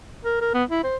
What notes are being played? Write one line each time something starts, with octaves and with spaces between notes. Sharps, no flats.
A#4
A#4
B3
E4
C5